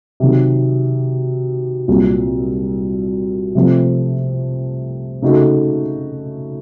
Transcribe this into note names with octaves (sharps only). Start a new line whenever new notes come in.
C3 D#3 F#3
C2 A#2 F#3
C3 F3 A3 C4
C#3 A3 D#4 F#4 A4